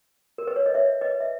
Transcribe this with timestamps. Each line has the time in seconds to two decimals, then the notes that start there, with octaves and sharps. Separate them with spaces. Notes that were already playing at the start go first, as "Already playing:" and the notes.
0.38 A#4
0.47 B4
0.56 C#5
0.66 D#5
0.74 C#5 E5
1.01 B4 D#5
1.20 E5